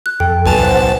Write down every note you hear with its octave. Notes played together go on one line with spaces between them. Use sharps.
F#6
F2 A4 G5
B1 B4 G#5 A5 F7
C5 F#5